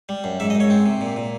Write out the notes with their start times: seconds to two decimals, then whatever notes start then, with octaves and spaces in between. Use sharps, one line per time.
0.09 G3
0.24 F#2
0.40 G#2 E5
0.50 D#5
0.55 G#2
0.60 C#5
0.70 C4
0.86 C3
1.01 A#2
1.16 A#2